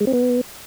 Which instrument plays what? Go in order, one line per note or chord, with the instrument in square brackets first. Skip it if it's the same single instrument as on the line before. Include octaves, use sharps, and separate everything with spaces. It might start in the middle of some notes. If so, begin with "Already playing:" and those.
[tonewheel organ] G#3
C4
B3